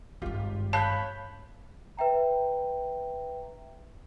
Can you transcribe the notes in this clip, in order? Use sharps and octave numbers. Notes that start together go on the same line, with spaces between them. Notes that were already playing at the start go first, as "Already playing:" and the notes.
G#1 G2 F4 G4
C#5 F5 A5 B5 F#6 G6
B4 E5 G5 A#5